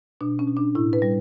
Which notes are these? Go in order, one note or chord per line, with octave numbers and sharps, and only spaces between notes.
B2 D4
C#4
B2
D4
A2 E4
B4
G3